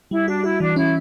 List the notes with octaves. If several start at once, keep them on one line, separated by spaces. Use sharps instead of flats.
G3 E4
D4 F#4
E4 F#4
E3 D4
C#4 E4